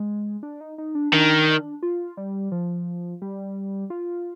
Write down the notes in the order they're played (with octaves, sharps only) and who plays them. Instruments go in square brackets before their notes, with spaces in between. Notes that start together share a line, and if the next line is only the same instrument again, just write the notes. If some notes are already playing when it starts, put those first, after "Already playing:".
Already playing: [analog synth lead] G#3
D4
D#4
D#4
D4
[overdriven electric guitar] D#3 [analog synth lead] D4
[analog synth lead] F4
G3
F3
G3
F4